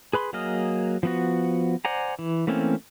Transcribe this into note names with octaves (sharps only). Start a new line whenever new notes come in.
G#4 B4 B5 C6
F#3 A#3 G#4 D#5 F6
F3 B3 F#4
C5 D5 F#5 G#5 A#5
E3
E3 A3 A#3 C4 C#4